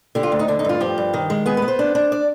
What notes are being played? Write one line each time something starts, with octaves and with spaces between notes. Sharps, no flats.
D3 G4
F4
D2
D#4
D3 D4
D#4
G2 F4
F3 G4
G2
D#3
G#3
B3 G#4
B4
B3
C5
D4
D4
D5